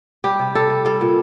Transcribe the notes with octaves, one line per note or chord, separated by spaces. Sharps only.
G3 G4
C3
G3 A4
C3
G3 A4
A#2